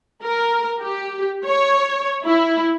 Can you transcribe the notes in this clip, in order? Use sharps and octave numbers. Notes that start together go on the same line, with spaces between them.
A#4
G4
C#5
E4